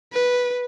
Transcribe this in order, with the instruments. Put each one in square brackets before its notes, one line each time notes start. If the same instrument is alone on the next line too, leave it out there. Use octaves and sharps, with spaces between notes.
[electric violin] B4